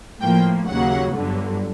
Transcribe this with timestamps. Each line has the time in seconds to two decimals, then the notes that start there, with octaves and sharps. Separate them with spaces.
0.21 A2 F3 A#3 G5
0.68 D#2 C#3 F#3 A#3 F#5
1.16 G1 G2 D3 F#3